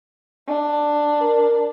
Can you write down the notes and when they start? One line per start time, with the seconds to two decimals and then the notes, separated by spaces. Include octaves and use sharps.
0.47 D4
1.21 A#4